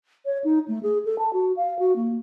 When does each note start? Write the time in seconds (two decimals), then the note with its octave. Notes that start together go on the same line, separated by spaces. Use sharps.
0.25 C#5
0.44 D#4
0.68 A3
0.83 G#4
1.05 A4
1.18 A5
1.33 F#4
1.57 F5
1.79 F#4
1.96 A#3